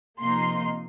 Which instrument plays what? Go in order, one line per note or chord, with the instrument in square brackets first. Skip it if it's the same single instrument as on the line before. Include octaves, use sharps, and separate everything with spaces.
[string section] C3 F3 A#3 D#4 C6